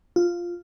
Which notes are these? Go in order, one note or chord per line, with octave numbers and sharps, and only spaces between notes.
F4